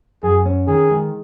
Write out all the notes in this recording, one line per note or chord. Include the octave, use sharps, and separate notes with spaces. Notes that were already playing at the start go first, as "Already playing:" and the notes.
F#2 G#4
C#4
D#3 G#4
G#3